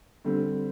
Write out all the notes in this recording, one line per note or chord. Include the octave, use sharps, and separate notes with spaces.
D3 G3 C4